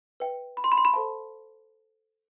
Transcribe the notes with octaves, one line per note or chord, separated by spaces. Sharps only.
B4 E5 G5
B5
C6
B5
C6
B5
A4 C5 F5 A5